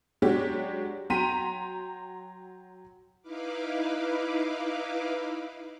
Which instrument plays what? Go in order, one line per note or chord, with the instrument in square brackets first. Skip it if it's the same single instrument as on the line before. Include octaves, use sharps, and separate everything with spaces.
[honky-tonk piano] F#3 G#3 D4 F#4 G4 C#5
F#3 G5 A#5 C6 B6 D#7
[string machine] D#4 E4 B4 F5 D6